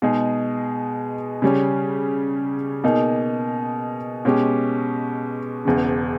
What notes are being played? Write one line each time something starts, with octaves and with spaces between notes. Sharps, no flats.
B2 G#3 D#4 G#4
C#3 G3 C#4
B2 A#3 D#4 G#4
B2 G#3 C#4 G4
E1 E2 C#3